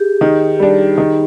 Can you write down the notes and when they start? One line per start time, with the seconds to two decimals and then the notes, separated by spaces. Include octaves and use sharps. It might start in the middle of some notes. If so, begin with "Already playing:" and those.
Already playing: G4 G#4
0.21 D#3 D#4
0.59 G3 D4
0.98 D#3